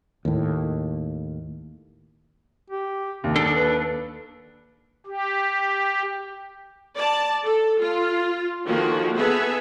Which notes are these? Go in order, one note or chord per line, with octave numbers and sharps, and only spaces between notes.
D#2 A2
G4
D#2 C3
D4 D#4 A4
B4
G4
D5 A5
A4
F4
D3 D#3 F3 A#3 F#4 G#4
B3 G#4 A4 E5